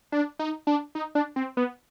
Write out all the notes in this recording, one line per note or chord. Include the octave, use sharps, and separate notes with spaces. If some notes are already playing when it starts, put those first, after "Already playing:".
D4
D#4
D4
D#4
D4
C4
B3